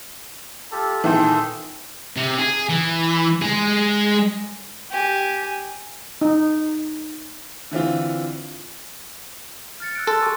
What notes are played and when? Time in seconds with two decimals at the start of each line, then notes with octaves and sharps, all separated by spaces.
0.71 F4 G4 A4
1.04 A#2 D#3 E3 G#4 A4 G5
2.17 C3
2.38 G#4
2.69 E3
3.42 G#3 G#4
4.91 G4 G#5
6.21 D#4
7.71 D3 E3 C4 F4
9.80 F6 A6 C#7
9.95 E6 F#6 D7
10.07 A4 C6 A6
10.21 G#5 C#6 D6